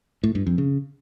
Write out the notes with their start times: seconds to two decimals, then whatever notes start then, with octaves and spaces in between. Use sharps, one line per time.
0.23 A2
0.35 G2
0.47 F2
0.58 C#3